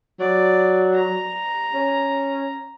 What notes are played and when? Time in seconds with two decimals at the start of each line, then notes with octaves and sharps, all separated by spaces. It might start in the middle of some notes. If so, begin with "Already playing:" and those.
0.20 F#3 D5
0.95 A#5
1.74 C#4